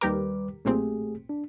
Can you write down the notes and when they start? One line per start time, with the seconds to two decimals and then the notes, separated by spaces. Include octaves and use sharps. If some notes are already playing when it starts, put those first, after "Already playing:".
0.01 D#2 G3 G4 A#4 B4 D6
0.65 B1 A#2 A3 C4 G4 G#4
1.29 D4